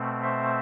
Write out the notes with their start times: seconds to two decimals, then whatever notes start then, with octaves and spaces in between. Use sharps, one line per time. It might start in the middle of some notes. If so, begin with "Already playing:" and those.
Already playing: B2 A3 C4
0.22 C5 E5